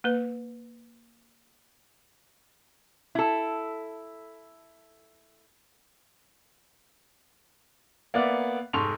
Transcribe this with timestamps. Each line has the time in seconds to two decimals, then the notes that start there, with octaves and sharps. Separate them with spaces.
0.04 A#3 B4
3.15 E4 A4
8.14 A#3 B3 D5 E5 F#5
8.73 F1 G#2 A4 C6 C#6 F7